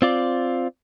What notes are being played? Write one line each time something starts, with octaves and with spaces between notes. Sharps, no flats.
C4 F4 D5